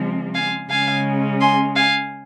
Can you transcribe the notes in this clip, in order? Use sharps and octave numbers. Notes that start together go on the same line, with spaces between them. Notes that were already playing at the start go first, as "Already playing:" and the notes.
Already playing: C#3 F3 G#3 C4
F5 G#5
C#3 G#3 C#4 F5 G#5
G#5 C6
F5 G#5